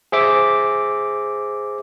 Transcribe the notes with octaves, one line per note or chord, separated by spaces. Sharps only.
G#4 C5 E5 D6